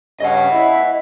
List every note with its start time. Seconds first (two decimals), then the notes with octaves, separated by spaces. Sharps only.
0.20 G2 C#3 C#4 D#5 F#5
0.51 E4